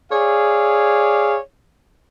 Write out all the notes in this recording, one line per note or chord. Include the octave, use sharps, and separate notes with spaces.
G#4 C#5 D5 F5